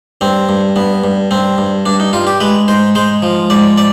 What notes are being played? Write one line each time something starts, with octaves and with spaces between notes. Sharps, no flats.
G2 C4
G2
G2 B3
G2
G2 C4
G2
G2 D4
D#4
G2 F4
G4
G#3 B4
G#2 C5
G#3 C5
F3
G#2 D5
D5